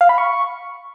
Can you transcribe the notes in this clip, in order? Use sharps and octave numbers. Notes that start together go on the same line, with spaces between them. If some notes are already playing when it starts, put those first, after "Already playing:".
F5
B5
C#6